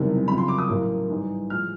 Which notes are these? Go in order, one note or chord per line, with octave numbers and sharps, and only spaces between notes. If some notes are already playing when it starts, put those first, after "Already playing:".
Already playing: F#1 E2 C3 D#3 G3
F2 C#3 F#3 B5
C6
D6
D#6
A1 A2 F#3 A#3 C#4
G#2 E3 G3
A2 F3 G#3 F6